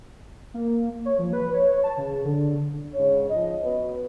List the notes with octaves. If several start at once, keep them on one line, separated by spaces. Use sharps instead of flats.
A#3
C#5
F3
B4
C#5
A5
C#3
D3
G#2 C#3 C#5
F3 C#4 D#5
B3 F#4 B4